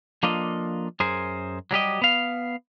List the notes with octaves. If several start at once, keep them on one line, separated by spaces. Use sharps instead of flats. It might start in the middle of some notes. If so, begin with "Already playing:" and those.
F3 A#3 D4 F4 A4 D#5
F#2 G#4 A#4 C5
F#3 G3 G4 D#5
B3 F5